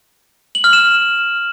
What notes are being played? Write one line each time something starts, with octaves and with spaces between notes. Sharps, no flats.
F#7
F6
E7